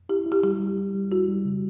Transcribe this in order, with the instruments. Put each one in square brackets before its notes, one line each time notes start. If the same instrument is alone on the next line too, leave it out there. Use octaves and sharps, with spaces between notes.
[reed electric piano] E4 [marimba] G4
[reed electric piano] E4
[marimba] G4
[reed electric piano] G3 [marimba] G4
[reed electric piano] G3
G3
G3
[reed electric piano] E4 [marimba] F#4
[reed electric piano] G3
C#3